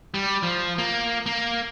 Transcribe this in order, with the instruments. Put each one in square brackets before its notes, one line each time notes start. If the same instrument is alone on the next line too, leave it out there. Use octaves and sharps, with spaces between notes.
[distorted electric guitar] G3
F3
A#3
A#3